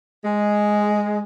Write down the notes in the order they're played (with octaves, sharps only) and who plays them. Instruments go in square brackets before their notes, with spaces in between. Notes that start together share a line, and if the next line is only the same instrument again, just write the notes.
[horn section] G#3